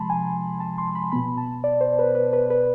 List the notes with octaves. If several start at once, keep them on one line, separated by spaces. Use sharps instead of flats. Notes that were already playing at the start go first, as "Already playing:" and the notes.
Already playing: C3 F3 G#3 A5 B5 C6
G#5
A5
C6
B5
B2 B3 B5
A5
D5
C5
B4
B4
B4
B4